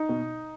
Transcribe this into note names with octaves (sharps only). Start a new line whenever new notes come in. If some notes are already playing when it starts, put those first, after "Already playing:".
Already playing: D#4
B2